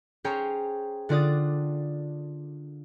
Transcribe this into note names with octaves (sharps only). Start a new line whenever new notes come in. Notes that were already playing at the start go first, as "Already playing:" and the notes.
C#4 G#4 C5 C#5 G5 A#5
D3 D4 F4 D5 D#6 A6